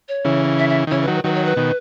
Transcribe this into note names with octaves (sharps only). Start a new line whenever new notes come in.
C#5
C#3 E3
E5
E5
D#3
C#3 E3 C#5
B4
D#3 F#3
B4
D#3 F#3 B4
C#5
B4
B2 D#3